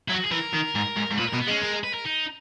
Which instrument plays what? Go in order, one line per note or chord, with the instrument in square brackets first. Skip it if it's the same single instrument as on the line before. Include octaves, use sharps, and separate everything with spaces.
[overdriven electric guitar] F#3 [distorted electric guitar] E4
[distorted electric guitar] F#4
G#4
[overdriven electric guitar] E3 [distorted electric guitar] A#4
[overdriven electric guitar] D#3
G#2
G#2
G#2
[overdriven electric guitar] A#2 [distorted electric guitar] B4
[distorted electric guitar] A#4
[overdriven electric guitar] B2
[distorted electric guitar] B3
[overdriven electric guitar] G#3 [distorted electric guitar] C#4
[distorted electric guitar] A#4
B4
A#4
D#4